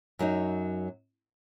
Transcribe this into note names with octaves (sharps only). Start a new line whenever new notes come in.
F#2 F#3 D#4